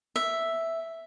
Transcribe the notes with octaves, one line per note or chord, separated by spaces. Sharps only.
E5